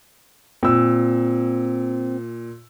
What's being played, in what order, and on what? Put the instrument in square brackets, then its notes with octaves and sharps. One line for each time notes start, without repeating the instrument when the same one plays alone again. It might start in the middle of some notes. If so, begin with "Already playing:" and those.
[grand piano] A#2 E6 [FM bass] C4